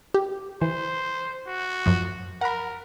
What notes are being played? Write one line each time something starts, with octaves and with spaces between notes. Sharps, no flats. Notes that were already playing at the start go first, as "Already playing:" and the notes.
G4
E3 C5
F#4
F#2 F3
A#4 F#5 B5